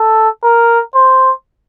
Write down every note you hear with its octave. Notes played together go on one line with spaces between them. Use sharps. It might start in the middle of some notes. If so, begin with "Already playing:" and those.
Already playing: A4
A#4
C5